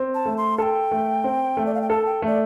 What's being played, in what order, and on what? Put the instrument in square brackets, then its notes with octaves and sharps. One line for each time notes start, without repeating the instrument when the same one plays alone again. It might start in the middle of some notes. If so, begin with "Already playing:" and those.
Already playing: [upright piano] C4
[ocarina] A5
[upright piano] A3
[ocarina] C6
[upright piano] A4 [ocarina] G5 A5
[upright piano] A3
C4
A3
[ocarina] D5
F5
G5
[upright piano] A4 [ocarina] A5
[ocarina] G5
[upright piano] A3 [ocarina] D5